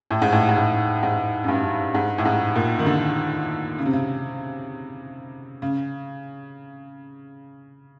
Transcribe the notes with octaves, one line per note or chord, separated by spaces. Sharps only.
A2
G#2
A2
G#2
A2
G#2
F#2
G2
G#2
A2
G#2
A#2
D#3
D3
C#3
C3
C#3
C#3